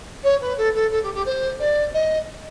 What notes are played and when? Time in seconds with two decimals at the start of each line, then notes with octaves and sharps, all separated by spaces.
0.23 C#5
0.41 B4
0.57 A4
0.75 A4
0.91 A4
1.03 G4
1.14 G4
1.26 C5
1.60 D5
1.94 D#5